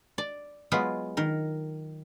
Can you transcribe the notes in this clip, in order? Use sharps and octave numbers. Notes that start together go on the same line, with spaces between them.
D5
F#3 G#3 B3 F4
D#3 A#4